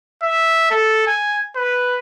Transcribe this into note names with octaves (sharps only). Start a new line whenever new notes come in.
E5
A4
G#5
B4